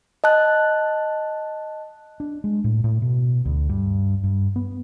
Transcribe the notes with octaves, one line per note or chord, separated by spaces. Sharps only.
D#5 A5 F#6
D4
G#3
A2
A2
B2
D2
G2
G2
B3